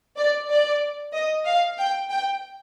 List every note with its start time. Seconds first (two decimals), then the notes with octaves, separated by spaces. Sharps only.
0.17 D5
0.50 D5
1.14 D#5
1.45 F5
1.78 G5
2.10 G5